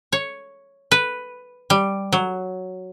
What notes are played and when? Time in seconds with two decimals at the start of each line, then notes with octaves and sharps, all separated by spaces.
0.13 C#5
0.92 B4
1.70 G3
2.13 F#3